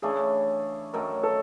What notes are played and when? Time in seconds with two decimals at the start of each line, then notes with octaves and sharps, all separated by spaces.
0.02 C#3 E3 A3 D4 G#4
0.93 F#2 D#3 F#3 A3 A#4
1.23 A4